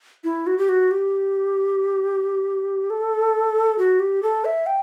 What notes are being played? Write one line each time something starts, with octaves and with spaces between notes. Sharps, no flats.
E4
F#4
G4
F#4
G4
A4
F#4
G4
A4
E5
G5